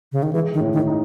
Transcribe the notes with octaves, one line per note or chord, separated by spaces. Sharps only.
C#3
D#3
E3 G#3
D#3
A2
D#3
D#4